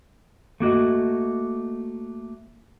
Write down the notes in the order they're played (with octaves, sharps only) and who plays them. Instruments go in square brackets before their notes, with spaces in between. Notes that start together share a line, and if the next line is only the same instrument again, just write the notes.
[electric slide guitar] A3 A#3 F#4 D#5